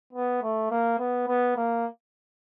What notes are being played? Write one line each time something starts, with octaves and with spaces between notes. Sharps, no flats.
B3
A3
A#3
B3
B3
A#3